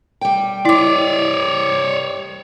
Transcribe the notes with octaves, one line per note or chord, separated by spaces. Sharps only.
G3 G5
E4 C#5 D5 D6